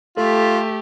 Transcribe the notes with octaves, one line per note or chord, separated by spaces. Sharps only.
A3 F4 G4 A4